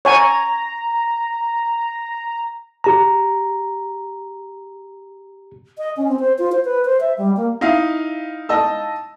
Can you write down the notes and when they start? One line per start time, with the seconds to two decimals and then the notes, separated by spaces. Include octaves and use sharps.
0.05 C#5 G#5 A#5
2.84 G4 A#5
5.78 D#5
5.97 C#4
6.08 C4
6.19 C5
6.39 F4
6.52 C5
6.65 B4
6.85 C5
7.01 E5
7.18 G3
7.37 A#3
7.61 D#4 E4 F5
8.49 D#5 A5 E6